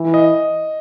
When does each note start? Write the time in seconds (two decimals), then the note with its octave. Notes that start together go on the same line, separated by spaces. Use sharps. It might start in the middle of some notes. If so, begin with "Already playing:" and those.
Already playing: E3
0.14 D#5